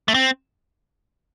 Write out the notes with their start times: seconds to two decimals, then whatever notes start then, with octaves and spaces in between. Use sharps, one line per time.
0.08 A3
0.14 C4